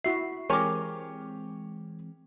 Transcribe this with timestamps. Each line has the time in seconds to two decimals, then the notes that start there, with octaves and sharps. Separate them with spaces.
0.04 E4 F#4 E5 C7
0.50 E3 G#3 C4 G4 A#4 C#5 G#5 D6